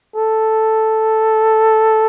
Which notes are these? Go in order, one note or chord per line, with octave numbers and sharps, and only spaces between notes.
A4